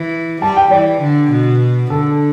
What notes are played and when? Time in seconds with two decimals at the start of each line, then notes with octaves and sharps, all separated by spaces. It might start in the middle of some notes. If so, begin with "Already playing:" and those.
Already playing: E3
0.41 G3 A5
0.57 G5
0.71 E3 D5
1.01 D3
1.31 B2
1.90 D3 A4